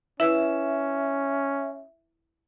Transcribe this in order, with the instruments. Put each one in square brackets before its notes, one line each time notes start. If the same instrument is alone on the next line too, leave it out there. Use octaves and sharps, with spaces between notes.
[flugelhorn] C#4 [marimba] E4 B4 E6 [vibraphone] E5